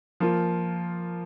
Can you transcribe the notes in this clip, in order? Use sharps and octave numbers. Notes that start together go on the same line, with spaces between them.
F3 A#3 F4